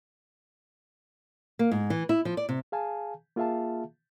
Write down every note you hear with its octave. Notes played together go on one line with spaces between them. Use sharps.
A#3
G#2
E3
E4
F3
D5
C3
G#4 F5 G#5 A5
A#3 F4 G#4 E5 F5 A5